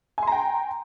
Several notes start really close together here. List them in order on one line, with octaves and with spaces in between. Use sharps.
G#5 C6 A#5 G5